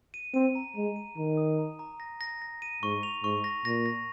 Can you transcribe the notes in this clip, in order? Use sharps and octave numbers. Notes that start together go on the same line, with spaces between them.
D#7
C4 D#7
A#5
G#3 A#5
D#7
D#3 A#5
D#6
A#5
A#5
A#6
A#6
A#6
D#7
G#2 C#6
F7
G#2 C#6
A#6
A#2 A#6
A#6